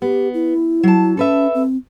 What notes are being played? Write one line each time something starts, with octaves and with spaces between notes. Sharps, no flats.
B3 G4
E4
F#3 A5
C#4 A4 B4 E5
C4